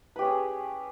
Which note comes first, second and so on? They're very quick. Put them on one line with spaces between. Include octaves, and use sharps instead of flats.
B4 G4 C#4 G#4